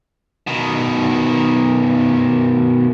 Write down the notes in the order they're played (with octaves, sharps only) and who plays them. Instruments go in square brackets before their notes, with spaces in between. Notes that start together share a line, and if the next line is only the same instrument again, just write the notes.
[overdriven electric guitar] B2 D#3